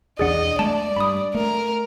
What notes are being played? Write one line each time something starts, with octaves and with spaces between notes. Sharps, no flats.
B1 E2 D4 G#4 D5 D#5 F#5
G#3 A3 D5 A5
G2 B5 D#6
A3 A#4